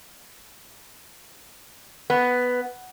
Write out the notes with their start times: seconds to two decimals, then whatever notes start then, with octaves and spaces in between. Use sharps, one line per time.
2.10 B3